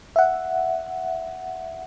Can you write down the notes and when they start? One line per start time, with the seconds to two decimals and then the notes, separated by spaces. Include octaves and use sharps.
0.16 E5 F#5